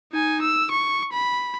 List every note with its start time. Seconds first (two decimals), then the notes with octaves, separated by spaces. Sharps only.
0.12 D#4 G#5
0.42 E6
0.72 C#6
1.12 B5